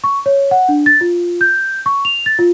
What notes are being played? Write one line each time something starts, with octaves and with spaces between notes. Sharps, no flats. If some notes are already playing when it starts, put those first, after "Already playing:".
C#6
C#5
F#5
D4
A6
F4
G6
C#6
F7
A6
F4